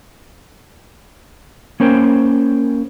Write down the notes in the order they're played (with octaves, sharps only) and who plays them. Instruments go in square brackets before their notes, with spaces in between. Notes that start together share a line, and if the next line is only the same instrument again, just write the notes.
[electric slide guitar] A#3 C#4 A#4 C5 G5